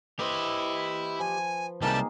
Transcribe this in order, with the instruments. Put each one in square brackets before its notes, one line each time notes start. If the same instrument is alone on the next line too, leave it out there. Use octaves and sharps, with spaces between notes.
[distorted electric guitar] E4 [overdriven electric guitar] G4 D#5 [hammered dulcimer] B4 C5
[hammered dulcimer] F3 [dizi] G#5
[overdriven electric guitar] C2 [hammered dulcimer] D#3 A#3 G#4 [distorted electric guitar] G3 G4 [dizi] A5